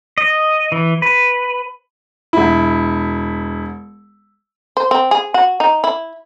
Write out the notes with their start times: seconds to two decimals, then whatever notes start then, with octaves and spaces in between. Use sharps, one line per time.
0.18 D#5
0.72 E3
1.02 B4
2.33 E1 E4
4.77 C5
4.91 C4
5.11 G#4
5.34 F#4
5.60 D#4
5.84 E4